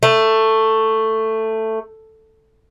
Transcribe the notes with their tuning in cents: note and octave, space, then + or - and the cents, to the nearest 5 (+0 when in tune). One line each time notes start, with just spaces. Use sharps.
A3 +10